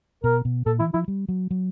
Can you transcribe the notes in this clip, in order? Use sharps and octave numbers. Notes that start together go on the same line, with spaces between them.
B2 A#4
B2
A#2 A4
E3 E4
F3 E4
G3
F#3
F#3